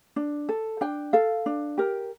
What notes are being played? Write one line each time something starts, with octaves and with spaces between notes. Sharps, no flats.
D4
A4
D4 G5
A4 F5
D4
G4 A#4